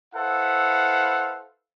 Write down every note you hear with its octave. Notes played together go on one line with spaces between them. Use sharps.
E4 A4 B4 C5 F5 F#5